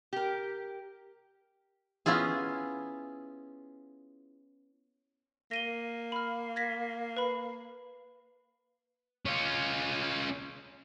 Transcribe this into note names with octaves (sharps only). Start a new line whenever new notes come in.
G4 A#4
B3 C#4 E4 F4 G#4
A#3 A#6 D#7 G7
B5 F6
G#6 A#6 B6
B4 B5
C#4 F4